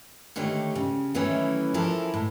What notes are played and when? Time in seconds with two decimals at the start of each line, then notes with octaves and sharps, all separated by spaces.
0.36 D3 D#3 A3 G4 C#5
0.75 C#3
1.15 D#3 E3 F#3 A3 C#4 E4
1.74 E3 F3 E4 A4 A#4
2.14 A2